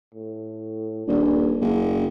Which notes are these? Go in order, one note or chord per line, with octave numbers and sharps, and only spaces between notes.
A2
D#1 D4
F#1 C#3